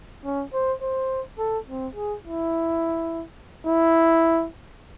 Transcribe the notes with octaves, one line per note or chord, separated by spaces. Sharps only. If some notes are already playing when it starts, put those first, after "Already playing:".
C#4
C5
C5
A4
C4
G#4
E4
E4